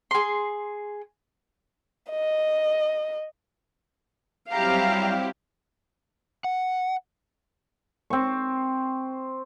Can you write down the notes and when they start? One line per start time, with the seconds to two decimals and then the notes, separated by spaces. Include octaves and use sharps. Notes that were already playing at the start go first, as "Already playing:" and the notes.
0.11 G#4 C6
2.10 D#5
4.51 F#3 G3 C4 E4 G4 F5 A#5
6.44 F#5
8.10 C4 C#6